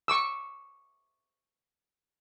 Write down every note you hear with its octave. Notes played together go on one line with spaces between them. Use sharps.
C#6 D6 E6